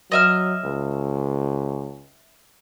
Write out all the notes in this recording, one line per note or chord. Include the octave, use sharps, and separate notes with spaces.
F#3 D#5 E5 F6
C#2